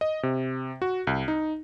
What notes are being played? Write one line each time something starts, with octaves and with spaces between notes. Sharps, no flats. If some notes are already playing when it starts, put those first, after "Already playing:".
D#5
C3
F#4
C2
D#4